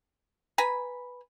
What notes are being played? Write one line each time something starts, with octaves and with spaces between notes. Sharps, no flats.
B4 G#5 A#5 B5